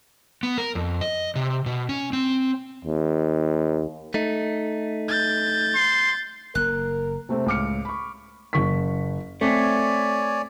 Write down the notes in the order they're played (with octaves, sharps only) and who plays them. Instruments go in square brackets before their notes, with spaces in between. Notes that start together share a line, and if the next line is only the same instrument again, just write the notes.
[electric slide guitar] B3
A#4
F2
D#5
C3
B2
C#4
C4
[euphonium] D#2
[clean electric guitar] A3 D#4
[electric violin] G6 A6
[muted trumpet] C6
[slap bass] F#1 A#3 [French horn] A#4 [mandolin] F#6
[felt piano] C3 A3 C4
C#2 A2 D6 F6 C#7
B5 C#6
[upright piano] F#1 C#6 B6
[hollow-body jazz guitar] A3 [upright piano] C4 [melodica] C#5 D5 G#5